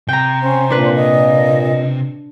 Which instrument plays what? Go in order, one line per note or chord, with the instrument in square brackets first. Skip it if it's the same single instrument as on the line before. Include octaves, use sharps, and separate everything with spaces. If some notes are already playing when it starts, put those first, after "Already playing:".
[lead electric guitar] C3 [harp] G5 A#5
[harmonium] C#4 [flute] C5
[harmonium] A#2 [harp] D4 B4
[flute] D#5